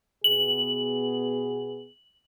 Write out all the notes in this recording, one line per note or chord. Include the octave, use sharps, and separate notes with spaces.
B2 B3 G#4 F#7